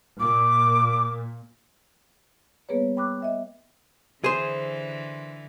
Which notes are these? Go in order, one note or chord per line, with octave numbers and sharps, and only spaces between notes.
A#2 D6
G3 A#3 B3 G#4 B4 C#5
G5 B5 C#6 D6 E6 F#6
D#5 E5 G5
D3 E3 G#4 C5